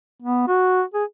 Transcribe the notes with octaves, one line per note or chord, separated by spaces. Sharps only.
B3
F#4
G#4